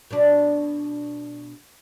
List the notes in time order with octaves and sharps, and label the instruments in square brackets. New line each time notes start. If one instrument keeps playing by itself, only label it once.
[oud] B2 D4